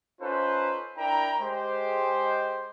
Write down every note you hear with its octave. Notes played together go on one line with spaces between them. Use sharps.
C#4 D#4 F4 A4 B4 C5
D4 E4 A#4 E5 G5 A#5
G#3 G4 C5